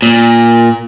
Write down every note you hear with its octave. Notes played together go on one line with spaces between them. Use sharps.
A#2